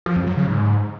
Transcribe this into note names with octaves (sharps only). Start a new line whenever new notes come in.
F3
F2
F#3
C#3
G#2